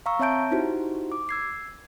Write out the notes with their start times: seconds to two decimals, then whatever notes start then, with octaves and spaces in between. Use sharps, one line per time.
0.06 F5 A#5 C#6 E6
0.19 C4 C#5 E5 A5 G6 D7
0.51 D#4 E4 F#4 G4 C5
1.12 D6
1.29 E6 G#6 C7